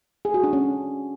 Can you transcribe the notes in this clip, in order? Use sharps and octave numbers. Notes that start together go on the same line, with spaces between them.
G#4
F#4
D4
C#4